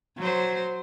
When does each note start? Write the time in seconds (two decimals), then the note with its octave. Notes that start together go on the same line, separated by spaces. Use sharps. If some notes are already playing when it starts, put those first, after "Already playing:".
0.18 F#3 C5